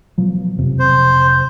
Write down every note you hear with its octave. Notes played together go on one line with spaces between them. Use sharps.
B2 F3 F#3
F2 C3
C5